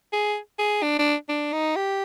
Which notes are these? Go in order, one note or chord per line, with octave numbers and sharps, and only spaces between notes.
G#4
G#4
D4
D4
D4
D#4
G4